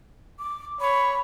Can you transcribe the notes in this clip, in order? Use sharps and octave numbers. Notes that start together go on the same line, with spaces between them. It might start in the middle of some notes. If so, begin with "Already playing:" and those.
D6
C#5 B5